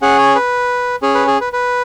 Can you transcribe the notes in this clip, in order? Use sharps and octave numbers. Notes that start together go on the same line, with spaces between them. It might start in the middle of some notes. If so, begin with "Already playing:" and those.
C#4 G#4 F#5
C#5
B4
C#4 G#4
B4
G#4
B4
B4